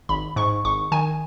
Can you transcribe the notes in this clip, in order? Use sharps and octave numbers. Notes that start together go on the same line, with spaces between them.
G#1 B5
G#2 C#6
G#1 C#6
D#3 G#5